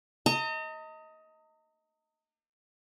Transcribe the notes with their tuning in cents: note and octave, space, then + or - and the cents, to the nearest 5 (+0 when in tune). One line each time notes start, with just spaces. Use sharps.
D#5 +20 A#5 -40